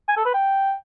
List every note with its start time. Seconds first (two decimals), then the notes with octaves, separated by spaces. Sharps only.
0.08 G#5
0.17 A4
0.25 B4
0.34 G5